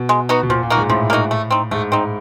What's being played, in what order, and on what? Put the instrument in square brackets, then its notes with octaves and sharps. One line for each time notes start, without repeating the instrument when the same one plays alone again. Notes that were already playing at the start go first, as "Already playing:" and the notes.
Already playing: [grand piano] B2
[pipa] G#3
B3 D#4 F#4
[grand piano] B2
[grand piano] A#2 [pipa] F3
[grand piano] A#2
[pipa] A#3 D#4 F#4
[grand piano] G#2
[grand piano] A2 [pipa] F3
[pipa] A#3 D#4 F#4
A3
C4 D#4
[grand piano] G#2 [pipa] A3
[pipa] C4 D#4